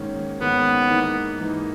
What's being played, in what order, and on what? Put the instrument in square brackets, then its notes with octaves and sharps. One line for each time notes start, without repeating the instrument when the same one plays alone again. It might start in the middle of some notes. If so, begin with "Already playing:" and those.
Already playing: [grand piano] G#2 D#3 A#3 C#4
[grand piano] G#2 D#3 A#3 C#4 [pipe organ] B3
[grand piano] G#2 E3 A#3 D#4
G#2 E3 A#3 D#4